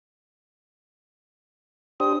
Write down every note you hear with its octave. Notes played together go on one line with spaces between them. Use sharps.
D4 G4 C5 D#6